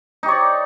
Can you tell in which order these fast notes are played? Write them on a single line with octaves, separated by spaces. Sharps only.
D#4 G4 C#5 D5